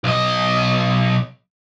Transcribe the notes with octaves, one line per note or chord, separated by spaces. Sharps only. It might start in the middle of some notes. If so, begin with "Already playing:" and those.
B1 D#5